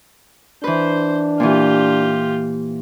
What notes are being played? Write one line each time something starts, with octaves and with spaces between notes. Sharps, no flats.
E3 D4 B4 C5
A#2 E3 F4 G4